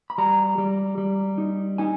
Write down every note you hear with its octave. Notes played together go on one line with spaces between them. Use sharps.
B5
G3 A#5
G3
G3
D#4
D#4 G#5